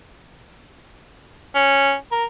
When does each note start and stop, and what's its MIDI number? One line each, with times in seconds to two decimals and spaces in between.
1.55 1.93 61
2.11 2.24 70